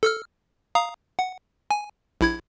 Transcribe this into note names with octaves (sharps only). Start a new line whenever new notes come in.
A4 E6 F6
F5 A#5 D#6
F#5
G#5
A#1 E4 G#6